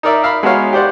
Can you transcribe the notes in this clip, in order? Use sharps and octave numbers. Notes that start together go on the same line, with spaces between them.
D#4 A#4 D5 E5
E5 F5 A#5 B5
G#3 B3 D#4 F#4 C#5 F5
G4 C5 D5 F#5